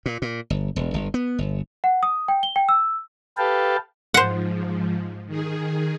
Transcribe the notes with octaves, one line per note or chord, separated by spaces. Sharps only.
A#2
A#2
G1
E1
G1
B3
G1
F#5
D#6
G5
G7
G5
E6
G4 A4 B4 F5 G5 A5
G#2 F3 C5 F#5
D#3 G#4